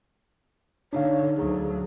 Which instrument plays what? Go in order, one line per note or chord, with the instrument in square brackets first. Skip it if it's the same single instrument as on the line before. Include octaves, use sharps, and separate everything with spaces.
[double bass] D3 [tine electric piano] D4 D#4 F5 [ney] C#5
[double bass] D2 F#3 [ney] G#4